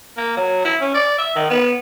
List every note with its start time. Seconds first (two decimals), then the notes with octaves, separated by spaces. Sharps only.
0.17 A#3
0.37 F#3
0.65 E4
0.81 C#4
0.94 D5
1.18 E5
1.35 D#3
1.50 B3